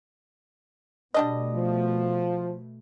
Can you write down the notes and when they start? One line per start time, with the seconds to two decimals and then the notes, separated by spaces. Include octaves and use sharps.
1.14 B2 G3 A3 D4 D#5
1.54 F3